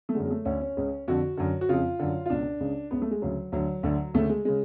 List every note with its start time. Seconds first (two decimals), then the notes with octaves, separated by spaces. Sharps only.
0.09 A3
0.15 F#2 D3 G#3
0.25 G#3
0.31 A3
0.45 D2 D3 C#4
0.61 C#4
0.77 C#2 C#3
1.08 F2 D3 F#4
1.37 F#2 D3
1.61 F#4
1.69 F2 C#3 F4
1.99 F#2 D3
2.26 F4
2.30 C#2 B2 D4
2.60 C#2 C#3
2.91 C#2 C#3 B3
3.02 A3
3.11 G#3
3.22 D2 C#3 F#3
3.52 D2 D3 F#3
3.83 D2 D3
4.14 D2 C#3 A3
4.29 G#3
4.45 C#3 G#3